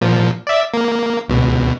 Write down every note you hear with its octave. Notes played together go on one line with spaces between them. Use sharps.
A#2 F3
D5 E5
A#3
C#2 B2